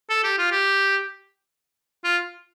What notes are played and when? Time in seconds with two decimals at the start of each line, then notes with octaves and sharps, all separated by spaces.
0.10 A4
0.24 G4
0.38 F4
0.51 G4
2.04 F4